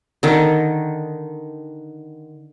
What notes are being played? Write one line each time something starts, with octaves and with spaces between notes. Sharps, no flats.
D3 D#3